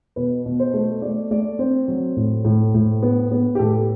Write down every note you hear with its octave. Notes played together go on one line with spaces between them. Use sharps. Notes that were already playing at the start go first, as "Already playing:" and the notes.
B2 B4
B2
C5
A3
A3 D5
A3 D5
C4 C5
F#3
A2
A2
A2
B3
B3
G4
A2 A4